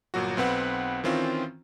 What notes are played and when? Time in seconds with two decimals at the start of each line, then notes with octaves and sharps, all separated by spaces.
0.14 G1 A#2 F#3 F#4
0.37 B1 C4 B4 F#5
1.04 D#3 E3 C4 C#4 F4